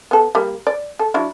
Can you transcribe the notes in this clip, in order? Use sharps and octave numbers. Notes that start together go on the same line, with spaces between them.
B3 A4
G3 A#3
D5
A4
F#3 D4 E4